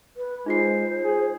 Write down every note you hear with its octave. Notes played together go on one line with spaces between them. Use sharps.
B4
G#3 D#4 F4 C5 C7
G#4